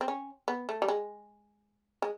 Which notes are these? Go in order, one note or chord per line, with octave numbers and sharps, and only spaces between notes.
C4
C#4
B3
A3
G3
G#3
G#3